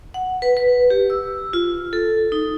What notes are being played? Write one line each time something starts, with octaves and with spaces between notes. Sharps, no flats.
F#5
B4
B4
G4
E6
F4
A4
D#4